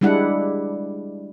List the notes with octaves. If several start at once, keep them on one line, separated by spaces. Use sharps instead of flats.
G3 G#3 D4 E4 F#5